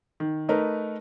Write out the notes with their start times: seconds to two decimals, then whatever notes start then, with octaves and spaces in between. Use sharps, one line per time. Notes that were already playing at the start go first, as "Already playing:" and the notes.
0.20 D#3
0.49 A3 D#4 A#4 B4